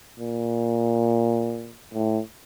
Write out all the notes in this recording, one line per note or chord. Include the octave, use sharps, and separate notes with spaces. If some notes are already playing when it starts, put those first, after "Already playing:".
A#2
A2